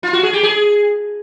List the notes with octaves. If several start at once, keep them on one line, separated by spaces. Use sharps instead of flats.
F4
F#4
G#4
G4
G#4